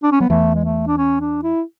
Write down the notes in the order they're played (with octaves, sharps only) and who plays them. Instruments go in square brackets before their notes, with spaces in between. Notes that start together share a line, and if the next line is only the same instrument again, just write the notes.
[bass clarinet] D4
C#4
[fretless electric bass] F#3 [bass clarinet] B3
[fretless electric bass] E2 E3 [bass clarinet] A3
[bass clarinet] G#3
A3
D4
C#4
D4
E4